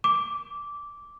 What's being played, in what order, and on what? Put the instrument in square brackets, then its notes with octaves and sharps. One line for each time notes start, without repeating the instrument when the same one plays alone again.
[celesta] D6